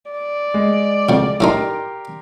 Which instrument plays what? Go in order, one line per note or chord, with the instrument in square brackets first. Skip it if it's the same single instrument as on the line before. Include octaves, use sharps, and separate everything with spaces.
[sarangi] D5
[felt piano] G#3
[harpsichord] F2 C#3
[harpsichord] A2 D4 D#4 [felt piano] G4 A#4 C6